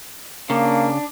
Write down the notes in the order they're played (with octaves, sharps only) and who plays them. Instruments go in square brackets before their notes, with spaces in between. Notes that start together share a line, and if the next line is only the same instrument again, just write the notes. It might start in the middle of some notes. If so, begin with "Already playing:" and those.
[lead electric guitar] C#3 [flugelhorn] A#3 [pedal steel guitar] D4